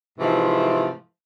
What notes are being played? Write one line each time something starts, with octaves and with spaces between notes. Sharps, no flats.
G#2 C3 E3 F3 G#3 A3